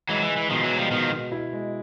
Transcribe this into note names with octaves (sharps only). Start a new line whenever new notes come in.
E3 F#3 G#3
E3
G#3
E3
B2 D#3 F3
E3 F#3
G#3
F3 G3
B2 D#3 F3
B2
E4
G#3